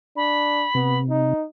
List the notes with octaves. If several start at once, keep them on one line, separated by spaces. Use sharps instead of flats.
D4 B5
C3 B3
D#4